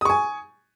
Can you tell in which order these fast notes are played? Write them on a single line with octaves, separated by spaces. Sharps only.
D#6 C#6 G#5